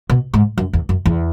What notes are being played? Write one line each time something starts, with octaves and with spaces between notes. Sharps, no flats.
B2
G#2
F#2
E2
F#2
E2